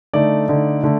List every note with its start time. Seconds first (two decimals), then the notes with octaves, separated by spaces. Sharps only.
0.14 D3 A3 D#4 D5
0.48 D3 A3 D#4
0.84 D3 A3